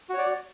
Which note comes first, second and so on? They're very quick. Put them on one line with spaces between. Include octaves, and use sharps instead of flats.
F#4 C#5 D5